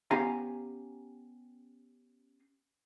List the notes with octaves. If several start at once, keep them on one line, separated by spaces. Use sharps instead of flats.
B3 C#4 G4 F5 G#5 A#5